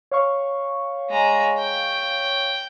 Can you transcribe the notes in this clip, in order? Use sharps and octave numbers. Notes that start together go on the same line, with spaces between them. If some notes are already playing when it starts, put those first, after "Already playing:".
C#5 F5 C#6
G#3 A#5
G5